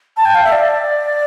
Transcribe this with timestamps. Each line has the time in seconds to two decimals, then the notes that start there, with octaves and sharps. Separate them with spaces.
0.16 A5
0.25 G5
0.34 F5
0.44 E5
0.52 D5